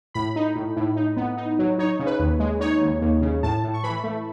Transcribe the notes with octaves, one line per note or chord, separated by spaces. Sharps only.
A2 B5
D#4
A2
A2
D#4
B3
D#4
F#3
D#4 C#5
C#3
B4
D#2
G#3
D#4 C#5
D#2
D#2
C#3
A2 A5
A2
C#6
E3 B5
A3